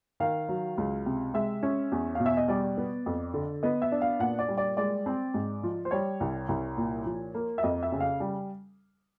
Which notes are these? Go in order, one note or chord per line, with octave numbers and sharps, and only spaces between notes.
D#3 F5
F#3
C#2
C3
G#3 E5
C#4
E2
B2 F5
E5
D#5
G3 D5
B3
F2
D3
B3 D#5
E5
D4
F5
A#2 F#5
D5
G3
D5
G#3 D5
C4
G#2
F3
C5
G3 C#5
C2
C2
A#2
F3
A#3
E5
F2 D#5
E5
C#3
F5
G3